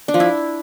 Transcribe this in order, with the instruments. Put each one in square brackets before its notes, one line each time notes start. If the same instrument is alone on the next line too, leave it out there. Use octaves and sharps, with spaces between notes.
[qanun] D4
F3
E4